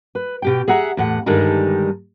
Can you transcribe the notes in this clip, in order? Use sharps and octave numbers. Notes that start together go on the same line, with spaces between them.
B4
B2 G4 G5
G#4 E5 F#5 A#5
E2 A2 F#5
G2 D3 D#3 G3 G#3 D#4